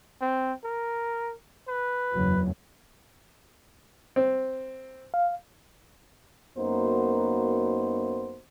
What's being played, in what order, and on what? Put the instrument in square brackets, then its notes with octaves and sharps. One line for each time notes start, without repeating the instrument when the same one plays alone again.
[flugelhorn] C4
A#4
B4
[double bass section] F#1 E2 F#3
[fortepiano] C4
[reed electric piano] F5
[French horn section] F#2 A#3 B3 D#4 F#4 C5